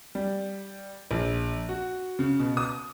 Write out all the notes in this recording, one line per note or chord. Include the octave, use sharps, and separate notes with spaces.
G3
A#1
F#4
C#3
B2
D#6